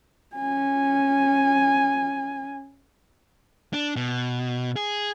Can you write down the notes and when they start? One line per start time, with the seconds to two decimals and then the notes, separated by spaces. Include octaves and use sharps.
0.36 C#4 G#5
3.73 D4
3.96 B2
4.76 G#4